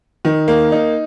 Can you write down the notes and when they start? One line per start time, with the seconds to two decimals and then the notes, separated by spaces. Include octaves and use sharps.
0.25 D#3
0.48 A#3
0.72 D#4